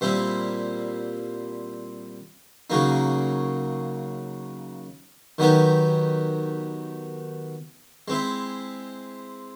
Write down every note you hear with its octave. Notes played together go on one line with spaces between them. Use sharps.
A#2 G3 C4 E4
C#3 F#3 A#3 D#4
D#3 F#3 B3 D#4 G4
G#3 C4 E4